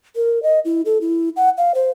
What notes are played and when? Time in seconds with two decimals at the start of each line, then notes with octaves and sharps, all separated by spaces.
0.16 A#4
0.43 D#5
0.65 E4
0.86 A4
1.01 E4
1.36 F#5
1.58 F5
1.75 C5